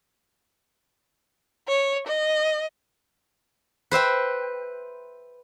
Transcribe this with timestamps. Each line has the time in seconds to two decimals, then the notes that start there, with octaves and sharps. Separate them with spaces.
1.68 C#5
2.07 D#5
3.91 B4 C5 E5 G5